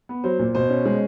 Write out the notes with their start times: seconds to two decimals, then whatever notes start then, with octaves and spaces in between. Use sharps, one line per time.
0.09 B3
0.24 F#3 C5
0.39 A#2
0.55 B2 C5
0.70 C#4
0.85 G#3